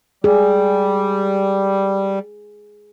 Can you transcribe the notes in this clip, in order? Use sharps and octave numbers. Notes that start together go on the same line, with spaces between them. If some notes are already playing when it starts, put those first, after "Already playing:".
G3 G#4